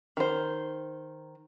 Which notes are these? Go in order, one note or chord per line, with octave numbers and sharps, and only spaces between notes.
D#3 C5